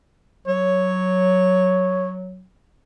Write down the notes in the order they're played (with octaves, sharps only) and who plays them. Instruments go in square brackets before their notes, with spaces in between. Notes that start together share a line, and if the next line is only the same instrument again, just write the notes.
[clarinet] F#3 [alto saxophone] C#5